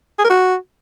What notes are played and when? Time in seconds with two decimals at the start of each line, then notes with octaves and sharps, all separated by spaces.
0.19 G#4
0.25 A#4
0.30 F#4